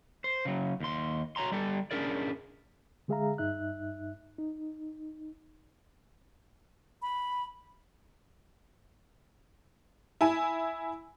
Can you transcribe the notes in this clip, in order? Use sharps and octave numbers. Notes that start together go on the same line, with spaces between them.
C5
C#3 F#3
D#2 C6
F#4 C#5 A#5 C6
G3 G4 A4
C#4 D4 E4 G#4 A#4 D5
D3 G#3 G#4 E5 F5 A#5
G2 D#4 E5 F#6
D#4
B5
E4 G#5